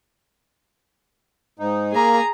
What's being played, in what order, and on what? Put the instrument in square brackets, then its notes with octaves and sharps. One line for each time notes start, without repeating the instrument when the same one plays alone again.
[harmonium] G#2 D#4
[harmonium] A#3 [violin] G#4 A#5